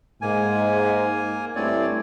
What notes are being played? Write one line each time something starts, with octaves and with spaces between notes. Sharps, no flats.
G#2 A#3 G#5
G2 A3 C4 E4 C#5 D5